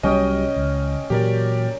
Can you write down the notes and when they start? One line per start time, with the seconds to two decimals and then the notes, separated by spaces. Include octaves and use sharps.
0.03 C2 F#3 G3 C#4 D#5 G5 D#6
0.56 C#2
1.10 A#2 E3 F#3 G4 A#4 D5